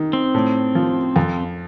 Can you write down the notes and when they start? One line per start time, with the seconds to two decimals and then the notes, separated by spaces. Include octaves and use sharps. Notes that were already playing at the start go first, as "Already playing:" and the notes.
Already playing: D#3
0.13 C4
0.34 A2
0.75 F3
1.16 F2